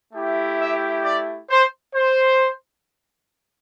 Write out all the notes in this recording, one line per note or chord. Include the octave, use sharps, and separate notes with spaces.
A3 E4 G4
E5
D5
C5
C5